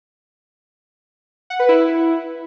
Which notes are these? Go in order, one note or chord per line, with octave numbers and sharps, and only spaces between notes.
F#5
B4
E4